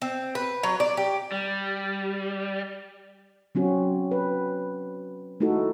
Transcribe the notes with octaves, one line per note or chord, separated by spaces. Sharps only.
C4
B4
F#3
D5
G4
G3
F#3 C4 C#4 F#4
B4
A3 D#4 E4 F#4 A4